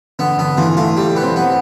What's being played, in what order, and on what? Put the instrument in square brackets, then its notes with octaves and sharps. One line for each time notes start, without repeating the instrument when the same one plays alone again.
[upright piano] D3 [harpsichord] B3
[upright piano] D3 [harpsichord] B3
[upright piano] E3 [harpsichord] F4
[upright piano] A3 [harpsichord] F4
[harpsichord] G3
B3
[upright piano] C4
[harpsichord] B3